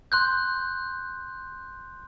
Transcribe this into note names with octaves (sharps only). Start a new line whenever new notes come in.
C6 F#6 G6